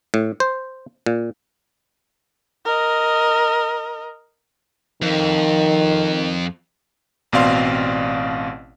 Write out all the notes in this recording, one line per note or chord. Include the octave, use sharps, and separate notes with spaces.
A2
C5
A#2
A#4 D#5
F2 D#3
A1 B2 C4 D5 F5 C6